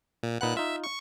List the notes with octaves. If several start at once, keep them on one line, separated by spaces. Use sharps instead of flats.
A#2
A#2 D#4 B4 F#5 F#6
D#4 F4 E5
C#6